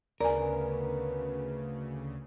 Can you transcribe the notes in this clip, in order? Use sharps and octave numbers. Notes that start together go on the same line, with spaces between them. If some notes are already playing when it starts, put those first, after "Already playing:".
D2 C#3 B3 A#4 D5 G#5